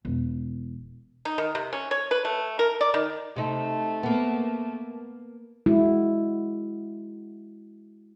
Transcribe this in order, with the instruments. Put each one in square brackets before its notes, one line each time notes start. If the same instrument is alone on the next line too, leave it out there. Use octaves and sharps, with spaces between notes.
[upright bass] E1
[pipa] D#4
D#3
C3
C#4
C#5
B4
A3
A#4
D5
D#3
[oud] C3 D#4 [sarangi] A3
[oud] A#3 B3
[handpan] G#3 E4 F#4